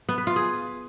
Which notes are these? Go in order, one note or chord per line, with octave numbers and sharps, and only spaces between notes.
B3
B4
F4
G#4